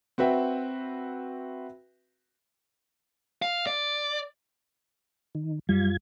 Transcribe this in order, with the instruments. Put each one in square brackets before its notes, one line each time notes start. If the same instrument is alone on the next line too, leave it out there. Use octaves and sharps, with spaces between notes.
[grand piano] C4 F#4 B4 E5 G5
[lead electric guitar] F5
D5
[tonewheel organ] D#3
[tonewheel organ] F#2 F4 G#6 [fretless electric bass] G3